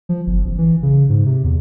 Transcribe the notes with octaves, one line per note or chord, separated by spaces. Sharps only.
F3
G1
A1
E3
C#3
G#2
C3
E2